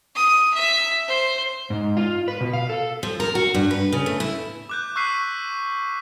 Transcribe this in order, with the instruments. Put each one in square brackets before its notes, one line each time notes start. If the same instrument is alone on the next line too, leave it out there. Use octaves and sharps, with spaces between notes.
[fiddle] D#6
E5
C5
[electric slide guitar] G#2
F4
B4
B2
F5
A4
[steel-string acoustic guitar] F3
A#4
F#4
G2
B4
C#3
A3
E4
[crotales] D6 F#6 G6
C#6 E6 F#6 B6 C7 D#7